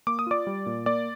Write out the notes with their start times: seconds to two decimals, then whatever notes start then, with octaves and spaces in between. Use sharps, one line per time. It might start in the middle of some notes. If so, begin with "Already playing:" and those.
0.07 A#3 D6
0.19 D#6
0.27 F4 D5 D6
0.47 G3
0.66 A#2
0.86 A#3 D5 D6